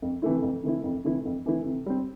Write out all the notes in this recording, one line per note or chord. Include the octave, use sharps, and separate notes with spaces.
F2
C3 E3 A3 E4
F2
C3 E3 A3 E4
F2
C3 E3 A3 E4
F2
C3 E3 A3 E4
C3
G3 C4